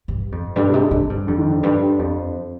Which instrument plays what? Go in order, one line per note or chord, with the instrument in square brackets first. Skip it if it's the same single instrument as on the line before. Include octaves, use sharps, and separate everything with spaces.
[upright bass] G2
F2
[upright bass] G2 [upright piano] D3
[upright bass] G#2 [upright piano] C3
[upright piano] D3
[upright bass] G#2
G2
[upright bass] F2 [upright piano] D3
[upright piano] D#3
D3
[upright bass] G2
F2